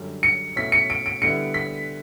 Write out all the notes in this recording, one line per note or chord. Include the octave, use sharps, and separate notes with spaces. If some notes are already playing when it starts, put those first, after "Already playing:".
Already playing: F#2 D3 G3
C#7
B2 A3 C#4 E4 B6
C#7
D7
D7
D3 G3 B3 E4 C#7
B6